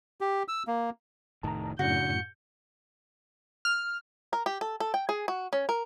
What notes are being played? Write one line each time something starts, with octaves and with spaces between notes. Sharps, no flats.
G4
E6
A#3
F1 A2 D#3 A5 A#5
F#2 A2 C#3 D4 F#4 G6 C#7
F6
A#4
G4
A4
A4
G5
G#4
F#4
C#4
A#4